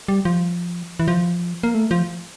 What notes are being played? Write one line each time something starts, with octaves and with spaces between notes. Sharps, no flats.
G3
F3
E3
F3
A#3
A3
F3